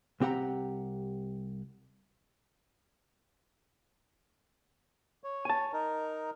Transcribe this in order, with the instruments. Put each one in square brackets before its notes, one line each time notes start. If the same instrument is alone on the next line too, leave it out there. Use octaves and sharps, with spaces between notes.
[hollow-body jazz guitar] C2 C4 G4 F#5 A#5
[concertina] C#5
[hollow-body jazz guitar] G#5 A5
[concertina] D#4 A#4